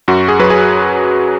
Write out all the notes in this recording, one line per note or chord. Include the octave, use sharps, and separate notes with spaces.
F#2 F#4
G#4
F#3 B4
G#4